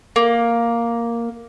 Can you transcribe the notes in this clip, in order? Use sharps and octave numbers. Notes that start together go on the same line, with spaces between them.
A#3